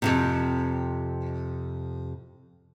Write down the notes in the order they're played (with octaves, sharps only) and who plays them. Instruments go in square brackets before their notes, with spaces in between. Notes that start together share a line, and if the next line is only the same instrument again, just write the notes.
[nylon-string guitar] F2 A2 C3